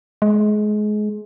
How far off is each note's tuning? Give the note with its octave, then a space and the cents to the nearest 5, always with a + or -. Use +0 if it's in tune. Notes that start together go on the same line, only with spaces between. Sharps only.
G#3 +25